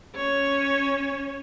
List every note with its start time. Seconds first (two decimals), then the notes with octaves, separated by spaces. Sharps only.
0.16 C#4 C#5